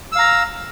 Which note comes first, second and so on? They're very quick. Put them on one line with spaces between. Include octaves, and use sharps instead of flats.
E6 F5 A#5